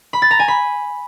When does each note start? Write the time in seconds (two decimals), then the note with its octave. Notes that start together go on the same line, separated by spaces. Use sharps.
0.13 B5
0.22 A6
0.31 A#5
0.39 G#5
0.48 B5